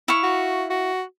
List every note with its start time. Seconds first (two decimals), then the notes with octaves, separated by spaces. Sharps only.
0.08 E4 F5 C#6
0.23 F#4
0.70 F#4